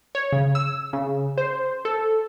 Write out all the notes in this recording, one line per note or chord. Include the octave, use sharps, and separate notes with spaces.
C#5
C#3
E6
C#3
C5
A4